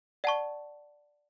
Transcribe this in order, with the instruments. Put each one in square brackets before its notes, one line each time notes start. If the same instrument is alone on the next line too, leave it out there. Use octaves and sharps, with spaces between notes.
[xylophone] D5 F#5 A5 C#6